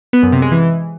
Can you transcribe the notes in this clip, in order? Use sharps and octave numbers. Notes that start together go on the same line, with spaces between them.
B3
F#2
C3
G#3
E3